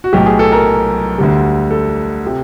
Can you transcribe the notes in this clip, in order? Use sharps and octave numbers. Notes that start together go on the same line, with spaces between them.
F#4
B1 A2 F#3 G4
G#4
A4
A#4
D2 D3 G3
A4
C3